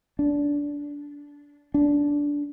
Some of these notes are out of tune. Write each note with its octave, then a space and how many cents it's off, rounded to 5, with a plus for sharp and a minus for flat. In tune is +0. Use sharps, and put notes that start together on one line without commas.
D4 -20
D4 -15